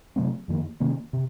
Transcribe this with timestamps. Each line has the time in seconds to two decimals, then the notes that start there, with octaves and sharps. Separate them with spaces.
0.16 C3 F#3 A3 C4
0.48 F2 D#3 A#3
0.80 C3 D#3 A#3 C#4
1.13 C3